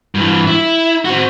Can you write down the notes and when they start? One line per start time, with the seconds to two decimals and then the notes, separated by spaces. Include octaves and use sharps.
0.15 G2 E3
0.47 E4
1.05 C4 F#4